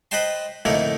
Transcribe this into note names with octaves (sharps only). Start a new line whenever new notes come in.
B4 C5 D#5 G5 A5 C6
F2 A2 D3 A3 A#3 D#4